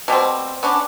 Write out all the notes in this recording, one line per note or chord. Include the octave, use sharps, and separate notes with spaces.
B2 G3 A3 C4
B3 C#4 D4